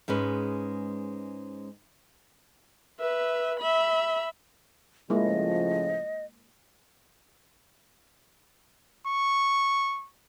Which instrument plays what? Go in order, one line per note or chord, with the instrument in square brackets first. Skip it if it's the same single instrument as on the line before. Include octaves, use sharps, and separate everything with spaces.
[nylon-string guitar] G#2 G#3 C#4 B4
[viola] B4 E5
E5 B5
[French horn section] A2 C#3 F3 [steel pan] G#3 A#3 E4 [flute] D#5
[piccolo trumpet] C#6